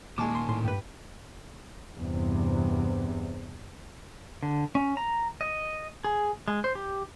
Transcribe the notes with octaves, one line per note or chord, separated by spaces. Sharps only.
D#2 A#2 D#3 G#3 G#5 A5 C#6 D6
C6
A2 C6
G2 G4 B4
E2 G2 C3
D3
C#4
A#5
D#5
G#4
G#3
C5
G4